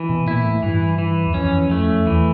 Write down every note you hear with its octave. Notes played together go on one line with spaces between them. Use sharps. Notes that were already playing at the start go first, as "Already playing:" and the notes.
Already playing: E3
B2
A#2 E4
A2
G2 E3
E3
E2
F2 C#4
F2
A3
F2
E2 E3